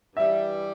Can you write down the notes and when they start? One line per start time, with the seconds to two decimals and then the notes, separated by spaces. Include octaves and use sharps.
0.16 G2 E3 G3 E5